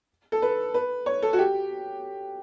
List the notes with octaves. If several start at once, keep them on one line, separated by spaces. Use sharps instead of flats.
A4
B4
B4
C#5
A4
F#4
G4